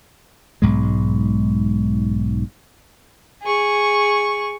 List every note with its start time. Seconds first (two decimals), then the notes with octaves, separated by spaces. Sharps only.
0.62 B1 G#2 G#3
3.42 G#4 C#6